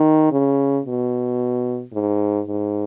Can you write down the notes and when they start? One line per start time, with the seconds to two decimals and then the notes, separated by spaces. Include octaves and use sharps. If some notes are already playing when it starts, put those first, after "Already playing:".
Already playing: D#3
0.32 C#3
0.86 B2
1.93 G#2
2.47 G#2